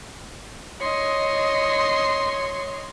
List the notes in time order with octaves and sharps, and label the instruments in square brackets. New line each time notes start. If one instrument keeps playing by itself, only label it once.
[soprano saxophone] C#5 [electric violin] D#5 C6